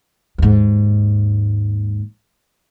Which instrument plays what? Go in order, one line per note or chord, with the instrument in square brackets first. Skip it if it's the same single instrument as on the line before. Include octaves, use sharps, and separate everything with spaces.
[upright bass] D#2 G#2